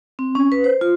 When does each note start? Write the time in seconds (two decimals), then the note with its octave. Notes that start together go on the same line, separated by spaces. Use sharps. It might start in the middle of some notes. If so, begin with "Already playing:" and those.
0.19 C4
0.35 C#4
0.52 B4
0.64 C5
0.81 F4